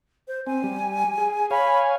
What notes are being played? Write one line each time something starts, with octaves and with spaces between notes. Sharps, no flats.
C5
C4 G#5
G3
G#4
C#5 F5 G#5 B5